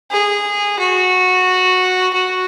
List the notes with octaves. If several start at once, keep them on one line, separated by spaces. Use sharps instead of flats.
G#4
F#4
F#4